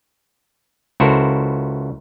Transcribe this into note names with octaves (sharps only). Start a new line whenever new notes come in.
C#2 E4 F#4 A4 A#4 C5